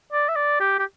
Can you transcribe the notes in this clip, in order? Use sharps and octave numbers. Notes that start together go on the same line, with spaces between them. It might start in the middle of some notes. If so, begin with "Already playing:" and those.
D5
E5
D5
G4
G4